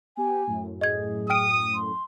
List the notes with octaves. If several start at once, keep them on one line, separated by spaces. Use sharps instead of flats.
B3 G4 G#5
F#2 A2
G#4 D#5 G#6
G5 D#6 F6 D7
C6